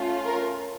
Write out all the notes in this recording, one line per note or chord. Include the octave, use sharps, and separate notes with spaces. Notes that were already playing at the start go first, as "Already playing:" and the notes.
Already playing: A3 C#4 F4
A#4